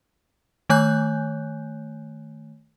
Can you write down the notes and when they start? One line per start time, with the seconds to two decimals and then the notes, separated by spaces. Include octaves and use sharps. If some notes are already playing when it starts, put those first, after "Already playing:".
0.69 D#3 A3 C#5 G#5 F#6 G6